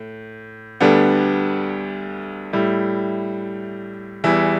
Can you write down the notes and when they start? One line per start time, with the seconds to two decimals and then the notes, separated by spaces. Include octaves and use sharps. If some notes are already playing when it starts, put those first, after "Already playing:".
Already playing: A2
0.81 D2 D3 G3 B3 D4
2.53 A2 G3 E4
4.24 E2 E3 G3 E4